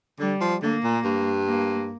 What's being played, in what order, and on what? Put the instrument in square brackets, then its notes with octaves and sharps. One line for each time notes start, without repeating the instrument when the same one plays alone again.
[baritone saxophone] D3 [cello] G3
[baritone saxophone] F3
[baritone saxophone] D3 [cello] A#3
[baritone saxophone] A#2
G2
[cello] A#3